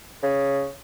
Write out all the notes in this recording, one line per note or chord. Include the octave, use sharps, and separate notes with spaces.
C#3